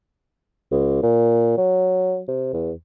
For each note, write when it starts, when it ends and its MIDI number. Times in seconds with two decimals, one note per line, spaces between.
0.71 1.00 37
1.03 1.57 46
1.57 2.20 54
2.28 2.49 48
2.53 2.71 40